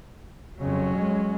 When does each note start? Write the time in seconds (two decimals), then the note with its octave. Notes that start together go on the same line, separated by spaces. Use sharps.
0.59 F2 C#3 F#3 C#4
0.95 G#3